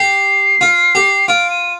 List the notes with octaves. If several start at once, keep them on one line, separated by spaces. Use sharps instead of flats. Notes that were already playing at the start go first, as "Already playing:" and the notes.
Already playing: G4 C7
F4
G4
F4 D7
D#7